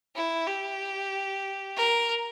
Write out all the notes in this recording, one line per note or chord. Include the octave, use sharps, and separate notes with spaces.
E4
G4
A#4